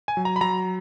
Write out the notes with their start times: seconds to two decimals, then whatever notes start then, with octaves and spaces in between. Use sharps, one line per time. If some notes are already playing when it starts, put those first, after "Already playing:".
0.08 G#5
0.17 F#3
0.25 A#5
0.36 B5
0.41 F#3 A#5